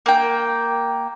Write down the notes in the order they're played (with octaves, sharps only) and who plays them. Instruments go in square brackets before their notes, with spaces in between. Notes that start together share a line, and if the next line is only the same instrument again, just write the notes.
[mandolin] A#3 G5